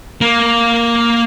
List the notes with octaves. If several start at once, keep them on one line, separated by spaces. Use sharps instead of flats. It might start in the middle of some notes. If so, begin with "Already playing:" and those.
A#3